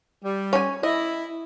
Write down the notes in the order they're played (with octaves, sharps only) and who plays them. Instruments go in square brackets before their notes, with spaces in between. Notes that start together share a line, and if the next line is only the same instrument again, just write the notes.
[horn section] G3
[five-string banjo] C#4 G#5
[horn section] E4 [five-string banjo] D#5